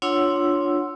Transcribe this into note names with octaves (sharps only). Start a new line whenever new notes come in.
D4 F4 C#5 F#5 C6 E6